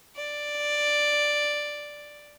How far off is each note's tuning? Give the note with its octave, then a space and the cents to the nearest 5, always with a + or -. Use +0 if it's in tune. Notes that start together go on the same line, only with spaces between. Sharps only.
D5 +5